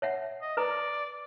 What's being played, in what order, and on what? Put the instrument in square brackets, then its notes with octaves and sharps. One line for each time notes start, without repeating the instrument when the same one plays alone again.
[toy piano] C#5 E5 F#5
[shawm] D#5
[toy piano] B4 A#5 [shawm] D5